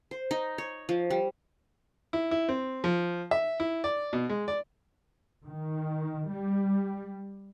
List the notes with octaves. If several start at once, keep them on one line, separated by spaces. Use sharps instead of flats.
C5
D#4
C#5
F3
G3
E4
E4
C4
F3
E5
E4
D5
B2
G#3
D5
D#3
G3